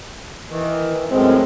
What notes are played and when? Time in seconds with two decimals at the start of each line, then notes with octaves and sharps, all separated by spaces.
0.49 D#3 E3
1.11 F#2 A2 G#3 C4